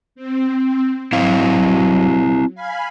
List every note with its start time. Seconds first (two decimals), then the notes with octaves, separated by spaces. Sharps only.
0.15 C4
1.13 F#3 C4 E4 F5
2.55 F5 G#5 B5